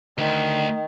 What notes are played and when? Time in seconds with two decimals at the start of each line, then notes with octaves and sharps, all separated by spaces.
0.18 D2 D#3